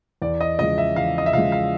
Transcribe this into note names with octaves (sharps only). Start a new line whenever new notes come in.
E2 D5
D#5
C#3 F3 G#3 D#5
E5
E2 F5
D#5
E5
C#3 F3 G#3 F5
F5